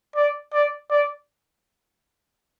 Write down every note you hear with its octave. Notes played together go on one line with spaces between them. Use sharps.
D5
D5
D5